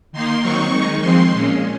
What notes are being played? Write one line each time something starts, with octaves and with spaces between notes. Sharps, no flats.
D#3 A#3 D#4 C6
D#3 F#3 C4 D#4 C#6
D#3 G#3 D#4
F3 G#3 C4 C6
A#2 G#3 C#4